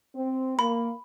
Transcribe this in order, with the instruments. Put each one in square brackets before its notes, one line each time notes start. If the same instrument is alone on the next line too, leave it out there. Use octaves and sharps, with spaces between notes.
[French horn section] C4
[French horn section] A#3 [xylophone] B5